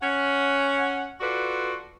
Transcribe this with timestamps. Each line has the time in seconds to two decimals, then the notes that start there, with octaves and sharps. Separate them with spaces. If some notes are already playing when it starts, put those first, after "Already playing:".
0.02 C#4 F#5
1.21 F4 F#4 A4 B4 D5